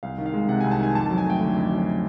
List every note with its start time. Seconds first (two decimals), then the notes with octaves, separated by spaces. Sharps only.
0.03 C2 F5
0.18 D#3
0.26 F5
0.33 G#3
0.48 C3 F#5
0.61 G#5
0.64 C2
0.71 A5
0.79 D#3 G#5
0.95 F2 A5
1.06 A5
1.10 F#3
1.18 G#5
1.25 A3 G5
1.41 D3
1.56 F2
1.71 F#3